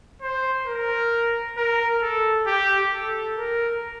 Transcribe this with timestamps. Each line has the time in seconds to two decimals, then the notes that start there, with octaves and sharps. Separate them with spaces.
0.22 C5
0.67 A#4
1.57 A#4
2.02 A4
2.47 G4
2.92 A4
3.37 A#4